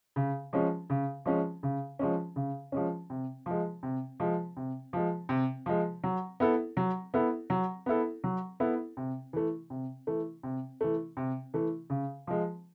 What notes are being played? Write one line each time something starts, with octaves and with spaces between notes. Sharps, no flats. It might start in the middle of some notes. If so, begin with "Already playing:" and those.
C#3
F3 G#3 C#4
C#3
F3 G#3 C#4
C#3
F3 G#3 C#4
C#3
F3 G#3 C#4
C3
F3 G#3
C3
F3 G#3
C3
F3 G#3
C3
F3 G#3
F#3
B3 E4 A4
F#3
B3 E4 A4
F#3
B3 E4 A4
F#3
B3 E4 A4
C3
E3 A3
C3
E3 A3
C3
E3 A3
C3
E3 A3
C#3
F3 G#3